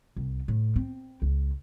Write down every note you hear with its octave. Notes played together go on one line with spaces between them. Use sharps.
C2
A2
C4
C#2